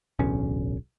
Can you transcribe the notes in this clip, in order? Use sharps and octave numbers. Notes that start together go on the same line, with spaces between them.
D1 B1 E2 C#4